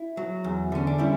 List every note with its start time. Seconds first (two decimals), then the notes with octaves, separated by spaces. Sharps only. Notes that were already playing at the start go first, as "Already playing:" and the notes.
Already playing: E4
0.17 F#3
0.44 E2
0.72 D3 C#4
0.87 D4
0.98 G3 C#4 E4